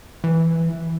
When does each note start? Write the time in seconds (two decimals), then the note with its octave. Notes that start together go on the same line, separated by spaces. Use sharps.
0.24 E3